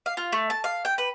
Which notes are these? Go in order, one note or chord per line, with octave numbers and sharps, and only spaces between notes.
F5
F4
A3
A5
F5
G5
B4